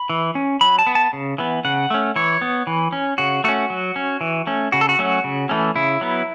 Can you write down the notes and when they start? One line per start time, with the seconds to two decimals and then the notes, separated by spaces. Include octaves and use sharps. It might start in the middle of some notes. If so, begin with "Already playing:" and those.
Already playing: B5
0.09 E3
0.35 C#4
0.61 F#3 B5
0.79 A5
0.87 B3
0.95 A5
1.13 C#3
1.38 E3 B3
1.65 C#3 F#5
1.90 A3 C#4
2.16 E3 C#5
2.41 B3
2.67 E3
2.92 C#4
3.18 C#3 F#4
3.44 A3 C#4 F#4
3.70 F#3
3.96 C#4
4.21 E3
4.47 A3 C#4
4.72 C#3 F#4
4.81 A4
4.89 F#4
4.99 F#3 A3 C#4
5.24 C#3
5.49 E3 A3 C#4
5.76 C#3 E4
6.01 F#3 B3